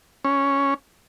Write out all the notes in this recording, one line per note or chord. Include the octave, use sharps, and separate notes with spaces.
C#4